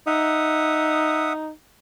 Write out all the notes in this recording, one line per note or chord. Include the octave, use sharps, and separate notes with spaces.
D#4 E5 F#5 D#6